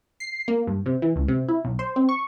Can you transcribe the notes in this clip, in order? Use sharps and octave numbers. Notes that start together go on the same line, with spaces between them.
C7
A#3
G2
C3
E3
C#2
C3
E4
B1
C5
C4
C#6